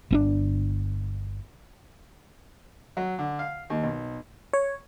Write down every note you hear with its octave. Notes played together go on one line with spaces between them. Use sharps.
G1 C4 D4
F#3
D3
F5
D#2
B1
C#5